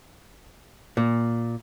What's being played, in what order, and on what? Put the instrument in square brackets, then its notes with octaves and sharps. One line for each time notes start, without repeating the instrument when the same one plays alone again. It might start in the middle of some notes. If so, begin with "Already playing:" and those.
[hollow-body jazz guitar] A#2